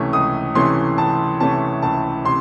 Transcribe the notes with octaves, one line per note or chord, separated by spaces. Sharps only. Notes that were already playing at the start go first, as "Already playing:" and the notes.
Already playing: C#2 C3 E3 A3 C#4
C#2 D#6
C3 E3 A3 C#4 C6
C#2 A5
C3 E3 A3 C#4 A5
C#2 A5
C3 C6